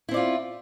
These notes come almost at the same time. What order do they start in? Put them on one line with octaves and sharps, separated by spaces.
E4 C4 D5 F4